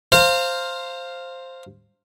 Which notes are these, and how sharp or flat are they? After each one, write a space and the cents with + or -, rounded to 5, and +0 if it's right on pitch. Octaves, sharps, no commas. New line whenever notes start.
C5 +5 F5 +0 A#5 -40